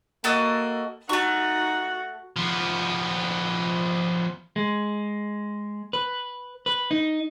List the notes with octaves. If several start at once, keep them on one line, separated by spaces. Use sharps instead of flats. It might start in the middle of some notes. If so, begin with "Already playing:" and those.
A#3 F#4 A4 D#5
A3 D#4 F#4 C#6
F3 B3
G#3
B4
B4
D#4